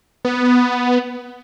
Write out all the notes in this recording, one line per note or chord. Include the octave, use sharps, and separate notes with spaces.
B3